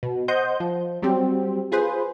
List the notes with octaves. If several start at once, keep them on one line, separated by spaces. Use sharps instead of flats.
B2
C5 D#5 F#5 G6
F3
F#3 G3 C4 G4
F4 G#4 B4 C5